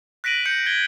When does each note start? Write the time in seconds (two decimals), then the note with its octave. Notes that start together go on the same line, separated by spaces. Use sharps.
0.24 F#6 A#6 B6 D7 D#7 F#7
0.46 G6 C#7
0.66 G#6 G7